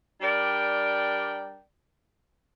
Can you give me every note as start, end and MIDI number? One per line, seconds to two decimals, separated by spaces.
0.22 1.61 55
0.22 1.61 62
0.22 1.61 70
0.22 1.61 74
0.22 1.61 79